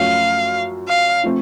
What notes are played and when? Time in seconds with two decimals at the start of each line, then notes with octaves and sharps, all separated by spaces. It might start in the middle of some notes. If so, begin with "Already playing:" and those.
Already playing: F#2 F3 A3 C#4 F5
0.89 F5
1.24 F3 A3 C4